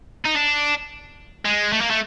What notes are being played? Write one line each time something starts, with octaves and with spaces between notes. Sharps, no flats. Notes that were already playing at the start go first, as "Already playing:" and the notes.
D#4
D4
G#3
A3
A#3
A3